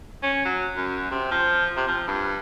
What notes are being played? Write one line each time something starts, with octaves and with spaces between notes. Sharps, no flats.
C#4
F#3
F#2
C3
F3
C3
F3
G2